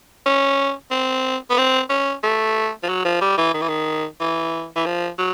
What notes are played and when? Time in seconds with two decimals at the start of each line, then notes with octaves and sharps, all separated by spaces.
0.26 C#4
0.91 C4
1.50 B3
1.58 C4
1.90 C#4
2.24 A3
2.83 F3
2.89 F#3
3.05 F3
3.22 G3
3.38 E3
3.54 D#3
3.62 E3
3.69 D#3
4.20 E3
4.76 E3
4.86 F3
5.19 F#3